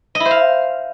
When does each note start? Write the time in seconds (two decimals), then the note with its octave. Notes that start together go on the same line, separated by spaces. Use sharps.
0.15 D#5
0.20 E4
0.25 C5
0.31 F5